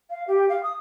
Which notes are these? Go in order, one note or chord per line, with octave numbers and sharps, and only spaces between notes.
F5
G4
F5
D#6